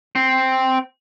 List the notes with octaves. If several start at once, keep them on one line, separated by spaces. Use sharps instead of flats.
C4